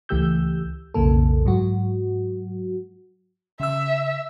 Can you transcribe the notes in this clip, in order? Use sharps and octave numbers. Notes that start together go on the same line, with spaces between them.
C#2 E3 A3 G4 E6 G6
B1 F2 C#3 A#3 A4
G#2 F#3 F#4
C#3 E5 E6